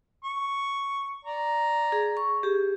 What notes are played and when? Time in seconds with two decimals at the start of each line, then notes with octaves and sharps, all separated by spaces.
0.24 C#6
1.25 D5 A#5
1.92 G#4
2.17 C#6
2.43 G4 G#4